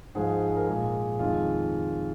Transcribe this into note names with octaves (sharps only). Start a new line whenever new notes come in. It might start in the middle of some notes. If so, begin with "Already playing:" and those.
G#2 F3 G#3 G#4
A#4
A#2 G#3 G#4
F2 D#3 G#3 F4